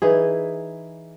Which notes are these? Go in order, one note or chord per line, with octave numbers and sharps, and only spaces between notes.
E3 D#4 G#4